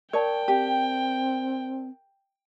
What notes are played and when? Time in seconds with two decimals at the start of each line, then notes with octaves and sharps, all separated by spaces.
0.13 A#4 C#5 D5 G5 A5
0.48 C4 G4